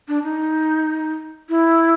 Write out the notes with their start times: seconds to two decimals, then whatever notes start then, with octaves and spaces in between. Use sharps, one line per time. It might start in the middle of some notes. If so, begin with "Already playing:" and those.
0.08 D4
0.24 D#4
1.49 E4